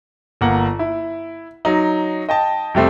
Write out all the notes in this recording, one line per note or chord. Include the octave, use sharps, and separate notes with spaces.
G1 A#3 F#5
E4
F#3 D#4
D#5 G5 A5
F2 C3 G3 A3 C4